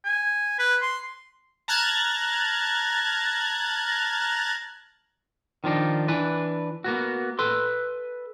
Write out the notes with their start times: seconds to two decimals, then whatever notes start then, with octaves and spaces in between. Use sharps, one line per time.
0.05 G#5
0.59 B4
0.81 C6
1.68 A5 A#5 F6 F#6 G#6 A6
5.64 D#3 F3 D4 D#4
6.08 E3 D4 B4
6.84 A#3 B3 F#4
7.39 A4 B4 C6